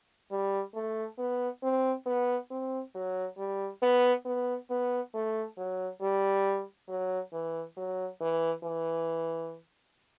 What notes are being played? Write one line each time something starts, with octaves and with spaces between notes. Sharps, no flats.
G3
A3
B3
C4
B3
C4
F#3
G3
B3
B3
B3
A3
F#3
G3
F#3
E3
F#3
E3
E3